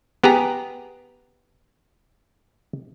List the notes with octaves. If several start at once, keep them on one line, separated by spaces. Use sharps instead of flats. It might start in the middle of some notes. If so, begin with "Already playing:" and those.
B3 G4 G#4 A#5